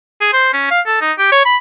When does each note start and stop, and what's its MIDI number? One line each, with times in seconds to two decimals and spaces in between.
0.21 0.31 68
0.33 0.50 72
0.53 0.71 61
0.71 0.81 77
0.86 0.97 69
1.01 1.13 63
1.19 1.28 67
1.32 1.44 73
1.46 1.57 83